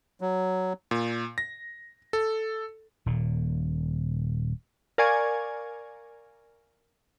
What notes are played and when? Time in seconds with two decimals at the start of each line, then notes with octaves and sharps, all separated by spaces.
0.21 F#3
0.91 A#2
1.38 A#6
2.13 A4
3.06 D#1 A#2
4.98 A#4 D5 F5 G#5 C#6 G#6